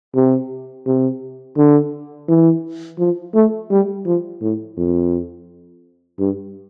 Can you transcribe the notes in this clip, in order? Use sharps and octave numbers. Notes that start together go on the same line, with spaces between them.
C3
C3
D3
E3
F3
A3
G3
F3
A2
F2
G2